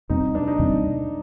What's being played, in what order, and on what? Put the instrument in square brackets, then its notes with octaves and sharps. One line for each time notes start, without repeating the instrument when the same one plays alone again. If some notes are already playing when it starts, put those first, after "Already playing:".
[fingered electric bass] E2 B2 G3 C4 [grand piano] D#4
[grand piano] D4
D#4
[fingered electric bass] E2 B2 G3 C4